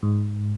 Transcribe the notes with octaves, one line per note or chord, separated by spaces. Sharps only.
G#2